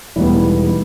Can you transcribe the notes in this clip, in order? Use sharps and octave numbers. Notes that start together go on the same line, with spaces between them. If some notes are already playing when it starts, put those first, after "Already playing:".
E1 E2 G3 A3 B3 D#4 E4